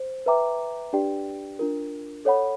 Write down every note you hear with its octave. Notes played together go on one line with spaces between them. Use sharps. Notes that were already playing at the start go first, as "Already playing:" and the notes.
Already playing: C5
B4 E5 G5 A#5 D6
D4 G4 B4 D5 G5
D4 F4 A#4
A4 C#5 F#5 B5